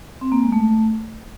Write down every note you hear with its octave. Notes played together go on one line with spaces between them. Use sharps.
C4
A#3
G#3
A3